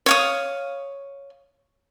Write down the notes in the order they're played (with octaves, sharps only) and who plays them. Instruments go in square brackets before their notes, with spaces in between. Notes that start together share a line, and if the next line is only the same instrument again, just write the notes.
[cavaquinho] C#5 F5 D#6